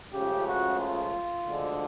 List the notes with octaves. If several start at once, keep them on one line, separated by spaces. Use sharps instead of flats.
C#2 C#3 F3 A3 G4
F#4
F4
D2 D3 F3 G#3